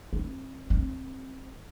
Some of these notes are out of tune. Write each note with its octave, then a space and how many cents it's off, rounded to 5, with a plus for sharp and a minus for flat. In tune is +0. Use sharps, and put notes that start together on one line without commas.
C4 +30
C4 +15